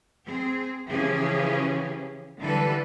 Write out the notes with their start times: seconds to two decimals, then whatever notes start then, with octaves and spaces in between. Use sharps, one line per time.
0.26 C4 G#4
0.89 C#3 E3 F3 C#4 G4 G#4
2.39 D3 E3 G3 A4 B4